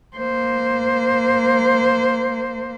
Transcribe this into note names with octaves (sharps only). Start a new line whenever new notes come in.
A#3 C5